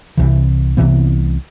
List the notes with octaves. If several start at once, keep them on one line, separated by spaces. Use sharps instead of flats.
C2 C3 E3
C2 C3 E3 B3